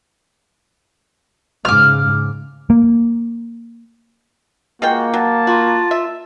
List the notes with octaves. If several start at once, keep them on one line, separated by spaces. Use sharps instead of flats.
G#2 C#3 D6 F6
A#3
G#3 A#3 F4 F#4 G5
F#3 A5
F4 F#4
E5